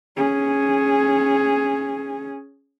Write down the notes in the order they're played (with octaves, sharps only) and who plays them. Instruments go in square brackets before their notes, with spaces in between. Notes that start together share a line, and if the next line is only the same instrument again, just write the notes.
[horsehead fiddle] C#4 G#4